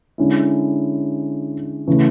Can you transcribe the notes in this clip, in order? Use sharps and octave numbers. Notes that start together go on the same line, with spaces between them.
D3 G#3 C#4 E4
C#3 E3 A3